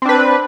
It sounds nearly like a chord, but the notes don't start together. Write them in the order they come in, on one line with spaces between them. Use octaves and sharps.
C4 D4 B4